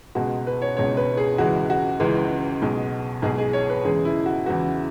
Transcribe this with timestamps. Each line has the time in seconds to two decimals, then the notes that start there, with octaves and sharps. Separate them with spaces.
0.15 C#2 B2 G#3 F#4
0.47 B4
0.62 C#5
0.77 C#2 B2 G#3 C#5
0.97 B4
1.17 G#4
1.38 C#2 C#3 E3 G#3 F#4
1.70 F#4
2.00 C#2 C#3 E3 G#3
2.62 B1 B2 G#3
3.22 B1 B2 G#3 G#4
3.38 G#4
3.53 C#5
3.70 B4
3.84 E2 C#3 E3 G#3 G#4
4.05 E4
4.26 F#4
4.46 E2 C#3 E3 G#3 F#4